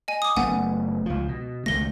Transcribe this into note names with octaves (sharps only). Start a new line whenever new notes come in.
D#5 G#5
D6 D#6
F#1 A3 B3 F#5 G#5
C#2 F3
B2
C#2 D#3 A3 A#6 G7